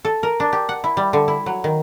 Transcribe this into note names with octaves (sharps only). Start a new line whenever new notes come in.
A4
A#4
D4
G4
F#5
E4
G3
D3
E4
F#3
D#3